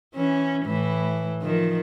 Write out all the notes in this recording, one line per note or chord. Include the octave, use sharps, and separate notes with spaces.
E3 C#4
A2 E3
D#3 F3